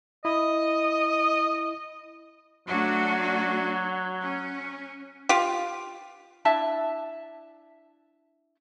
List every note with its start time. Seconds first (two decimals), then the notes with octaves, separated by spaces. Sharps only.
0.25 E4 D#5
2.68 F#3 A3 D4 F#4
4.21 C#4
5.29 F4 G4
6.45 D4 E4 E5 A5